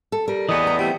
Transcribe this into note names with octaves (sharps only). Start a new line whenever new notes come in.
A4
G3 A#4
E2 A2 E3 B3 D5 D#5
A#5
G3 A3 C4 E4 G5